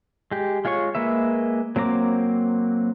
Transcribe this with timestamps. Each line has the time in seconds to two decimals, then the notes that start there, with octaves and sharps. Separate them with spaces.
0.31 G#3 G4
0.65 G#3 F4 G#4 C#5 C#6
0.95 G#3 A#3 B4 E5
1.76 F#3 A#3 C4 A#5 D6